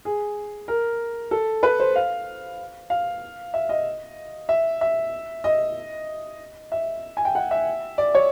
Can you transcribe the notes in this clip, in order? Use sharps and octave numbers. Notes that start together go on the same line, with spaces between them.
G#4
A#4
A4
B4
C5
F5
F5
E5
D#5
E5
E5
D#5
E5
G#5
G5
F#5
E5
D5
C#5